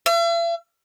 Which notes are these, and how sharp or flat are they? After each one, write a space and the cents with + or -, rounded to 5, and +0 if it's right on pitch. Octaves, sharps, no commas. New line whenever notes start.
E5 +45